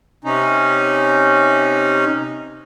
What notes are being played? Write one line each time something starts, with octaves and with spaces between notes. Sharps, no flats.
C3 C#4 D#4